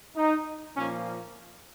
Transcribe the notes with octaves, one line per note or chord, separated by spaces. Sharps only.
D#4
A#2 F3 A#3 C#4